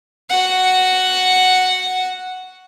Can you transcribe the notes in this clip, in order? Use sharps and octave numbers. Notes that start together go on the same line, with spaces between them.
F#4 F#5